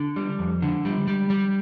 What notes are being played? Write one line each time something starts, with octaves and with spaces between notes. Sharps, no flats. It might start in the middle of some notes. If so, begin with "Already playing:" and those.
Already playing: D3
G3
F2
D3
G3
G3
G3